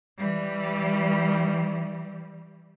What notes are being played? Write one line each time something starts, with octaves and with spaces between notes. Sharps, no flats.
E3 G3